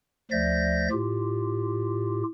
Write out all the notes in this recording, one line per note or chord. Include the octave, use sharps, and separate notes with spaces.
D2 F3 D5 E5 G6 A#6
A2 F4 G4